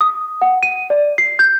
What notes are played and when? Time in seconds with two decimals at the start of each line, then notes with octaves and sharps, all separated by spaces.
0.01 D#6
0.42 F#5
0.63 D#7
0.90 D5
1.18 C7
1.39 G6